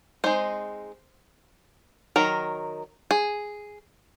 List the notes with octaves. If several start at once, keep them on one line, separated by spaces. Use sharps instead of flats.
G#3 C4 D#4 C5
D#3 F#3 A#4
G#4